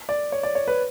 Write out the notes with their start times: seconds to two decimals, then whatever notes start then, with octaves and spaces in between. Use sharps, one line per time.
0.09 D5
0.32 C#5
0.43 D5
0.55 C#5
0.68 B4